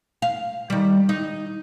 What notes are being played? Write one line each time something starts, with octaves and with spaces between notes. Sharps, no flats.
F5
D#3 G3
D#4